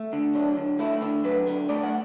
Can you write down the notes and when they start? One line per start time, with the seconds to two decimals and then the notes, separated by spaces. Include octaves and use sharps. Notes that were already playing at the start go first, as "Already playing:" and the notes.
Already playing: A3
0.13 D3
0.35 F#3 D4
0.57 D3
0.79 A3 E4
1.02 D3
1.24 F#3 B4
1.47 D3
1.69 A3 D5
1.83 F#5